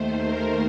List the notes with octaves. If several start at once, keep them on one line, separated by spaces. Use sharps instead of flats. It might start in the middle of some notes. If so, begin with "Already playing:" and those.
Already playing: D#2 D#3 A3 C5
A#4